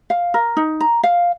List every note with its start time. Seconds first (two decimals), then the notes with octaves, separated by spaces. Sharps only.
0.10 F5
0.34 A#4
0.57 D#4
0.80 A#5
1.03 F5